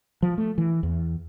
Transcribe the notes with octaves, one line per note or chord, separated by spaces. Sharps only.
F3
A3
E3
E2